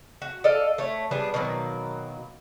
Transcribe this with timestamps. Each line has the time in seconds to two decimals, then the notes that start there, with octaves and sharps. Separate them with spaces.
0.22 F#4
0.44 A4 D5 D#5 F5
0.78 A3 C#5
1.11 G3 B3 D4 G#4
1.34 B2 D#3 F#3 A#3